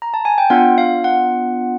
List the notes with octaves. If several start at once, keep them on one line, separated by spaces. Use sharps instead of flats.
A#5
A5
G#5
G5
B3 D4 F4 F#5
F5
F#5